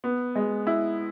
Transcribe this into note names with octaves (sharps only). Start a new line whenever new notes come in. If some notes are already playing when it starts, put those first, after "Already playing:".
B3
G#3
E4